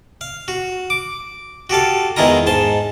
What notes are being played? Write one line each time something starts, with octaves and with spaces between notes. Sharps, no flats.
F5
F#4
D6
F#4 G4 A4 F5
E2 D#3 G#3 E4 F4 A#5
G#2 A5 C6